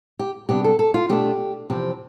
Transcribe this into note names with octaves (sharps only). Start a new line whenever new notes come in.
G4
C3 G3 B3 D4 G4
A4
A4
F4
B2 A3 D4 G4
E2 C3 F3 C4 G4